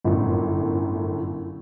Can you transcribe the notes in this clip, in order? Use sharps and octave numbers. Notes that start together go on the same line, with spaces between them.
G1 F#2 A2